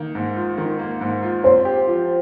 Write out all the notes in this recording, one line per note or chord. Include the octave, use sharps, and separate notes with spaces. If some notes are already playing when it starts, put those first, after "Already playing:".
Already playing: D#3 A#3
G#2
F4
D#3
A#3
G#2
F4
C4 C5
G4
F3